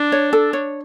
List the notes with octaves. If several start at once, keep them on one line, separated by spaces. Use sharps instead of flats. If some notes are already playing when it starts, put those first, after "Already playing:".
Already playing: D4
C#5
A4
C#5